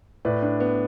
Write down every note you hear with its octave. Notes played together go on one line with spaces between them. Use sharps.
A2 B4 D5
D4
B3